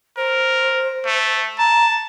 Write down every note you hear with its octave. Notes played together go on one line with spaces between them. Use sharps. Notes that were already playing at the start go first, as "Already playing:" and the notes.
A#4 C5
A3
A5 A#5